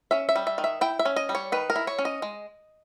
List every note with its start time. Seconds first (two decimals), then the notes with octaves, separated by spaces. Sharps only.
0.11 C#4 E5
0.29 E5
0.36 G3
0.47 E5
0.58 D#3
0.64 E5
0.81 E4 G5
0.99 E5
1.05 C#4
1.16 D#5
1.29 G3
1.35 C#5
1.52 D#3 B4
1.70 A#4
1.76 E4
1.87 C#5
1.99 C#4
2.05 D#5
2.22 G#3